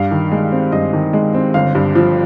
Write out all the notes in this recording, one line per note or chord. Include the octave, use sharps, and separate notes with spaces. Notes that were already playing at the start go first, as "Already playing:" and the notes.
Already playing: G2 F5
D#3
G#3
C4
G2 D#5
D#3
G#3
C4
G1 F5
G2
F3